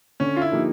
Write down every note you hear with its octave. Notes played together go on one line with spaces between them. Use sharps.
D3 C#4
F4
E4
F3 A#3 D#4 G4